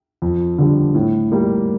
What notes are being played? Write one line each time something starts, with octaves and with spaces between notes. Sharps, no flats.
F2
D3 G3
A2
G3 A#3